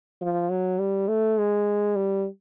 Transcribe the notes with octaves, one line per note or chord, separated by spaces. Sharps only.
F3
F#3
G3
A3
G#3
G3